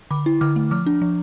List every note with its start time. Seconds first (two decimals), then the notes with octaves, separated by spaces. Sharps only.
0.11 D3 B5 D6
0.26 E4
0.41 D3 D6 F6
0.56 A3
0.71 F3 D6 F6
0.86 D4
1.02 F3